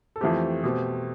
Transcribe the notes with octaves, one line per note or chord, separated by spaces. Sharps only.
A4
F2 E3 A3 C4 G4
B2 A3 C4 G4